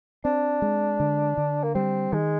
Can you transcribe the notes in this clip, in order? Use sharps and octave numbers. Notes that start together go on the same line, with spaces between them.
C4 D4
G#3
D3
D3
A#3
G3 C4
D#3 G#3